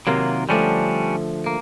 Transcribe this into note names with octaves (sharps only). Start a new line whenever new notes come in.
C3 D#3 F#3 A#3 F4
D3 F3 G3 A3 C#4 D4
A#3